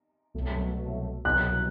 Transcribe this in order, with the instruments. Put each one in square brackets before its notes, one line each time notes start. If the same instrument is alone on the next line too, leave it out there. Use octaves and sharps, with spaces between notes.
[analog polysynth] C2 B2 F#3 A3
[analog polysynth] C2 B2 F#3 [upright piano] F#6